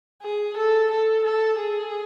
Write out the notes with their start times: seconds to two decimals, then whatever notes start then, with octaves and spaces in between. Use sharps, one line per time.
0.22 G#4
0.57 A4
0.91 A4
1.24 A4
1.58 G#4